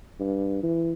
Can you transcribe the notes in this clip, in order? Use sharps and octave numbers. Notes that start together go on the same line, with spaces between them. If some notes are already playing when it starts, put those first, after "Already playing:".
G2
E3